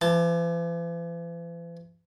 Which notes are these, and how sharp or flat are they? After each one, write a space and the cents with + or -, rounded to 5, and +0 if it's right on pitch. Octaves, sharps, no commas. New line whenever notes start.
E3 +45 A5 +0